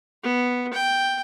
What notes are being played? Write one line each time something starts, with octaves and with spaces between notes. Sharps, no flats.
B3
G5